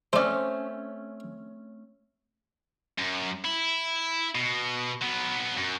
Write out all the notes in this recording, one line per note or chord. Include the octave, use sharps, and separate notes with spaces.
A3 C4 C#4 C5 D5
F#2
E4
B2
F#3 B3
F#2